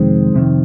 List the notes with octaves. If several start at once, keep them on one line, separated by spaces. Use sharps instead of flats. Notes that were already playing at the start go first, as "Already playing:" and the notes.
Already playing: F2 C3 D#3 G#3 C4
F2 C3 D#3